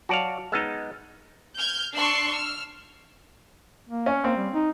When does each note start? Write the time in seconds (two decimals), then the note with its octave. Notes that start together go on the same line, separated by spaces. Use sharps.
0.09 F#3 F#4 D5 F5 A5
0.52 G#3 B3 D#4 E6 F6 A6
1.58 F6 G6 G#6
1.95 D4 C6 C#6 E6 F#6 C7
2.31 E6 F6
3.90 A#3
4.06 C#4
4.24 A#3 C4
4.37 G3
4.53 D#4